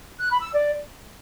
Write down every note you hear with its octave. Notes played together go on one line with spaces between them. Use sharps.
F#6
B5
E6
D5